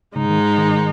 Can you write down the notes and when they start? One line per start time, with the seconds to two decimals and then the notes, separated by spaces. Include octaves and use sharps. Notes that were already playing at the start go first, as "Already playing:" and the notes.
0.15 G#2 C#3 G#3 D#4
0.29 D#3
0.58 D#3